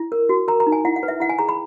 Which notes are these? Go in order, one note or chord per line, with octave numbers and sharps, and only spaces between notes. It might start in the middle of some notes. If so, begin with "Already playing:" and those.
Already playing: E4
A#4
F#4
A#4 A#5
A#5
D#4
G#5
E4 F#5
F#5
B4
E5
E4 F#5
G#5
G#4 A#5
B5